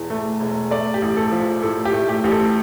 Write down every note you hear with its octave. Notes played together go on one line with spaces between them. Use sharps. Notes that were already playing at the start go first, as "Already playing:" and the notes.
Already playing: E1 E2
A3
E1
A3 D5
G4
A1
A4
F3
A2 A4
G4
A3
G4
A1 G4
A4